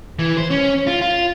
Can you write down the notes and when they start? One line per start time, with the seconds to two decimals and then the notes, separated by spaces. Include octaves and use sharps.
0.19 E3
0.37 C5
0.50 C#4
0.87 F4
1.01 F4